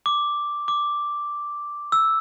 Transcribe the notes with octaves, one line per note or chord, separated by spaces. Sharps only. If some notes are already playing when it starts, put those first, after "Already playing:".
D6
D6
E6